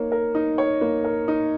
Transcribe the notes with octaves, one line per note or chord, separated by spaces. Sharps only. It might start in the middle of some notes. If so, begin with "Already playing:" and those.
Already playing: A#3 D#4 C#5
A#4
D#4
C#5
A#3
A#4
D#4